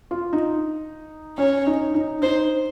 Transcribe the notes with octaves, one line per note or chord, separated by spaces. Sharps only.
F4
D#4
C#4 C#5
D#4
D#4
D#4 C5